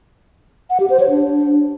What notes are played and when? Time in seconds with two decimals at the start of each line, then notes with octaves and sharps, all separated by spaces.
0.70 F#5
0.80 G4
0.90 C5
1.00 C#5
1.10 D4